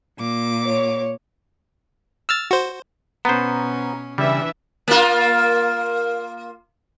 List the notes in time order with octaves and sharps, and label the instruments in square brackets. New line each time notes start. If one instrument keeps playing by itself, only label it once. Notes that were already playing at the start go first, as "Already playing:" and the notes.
[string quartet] A#2 D6
[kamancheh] C#5
[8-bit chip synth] E6 F6 A6
F#4 C5
[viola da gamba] B2 C#4 [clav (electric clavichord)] B3 C5 [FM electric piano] A#5
[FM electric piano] C#3 [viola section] E3 D4 E5 [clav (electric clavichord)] G3
[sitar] A#3 F4